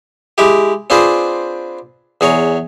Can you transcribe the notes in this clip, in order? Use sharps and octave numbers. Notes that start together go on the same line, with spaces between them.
G#3 E4 G4
C4 D4 F4 G#4 B4 C5
E2 G#4 C#5 A#5